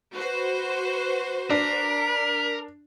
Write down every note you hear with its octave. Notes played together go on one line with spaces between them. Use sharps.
F#4 B4 C5
D4 A#4 B6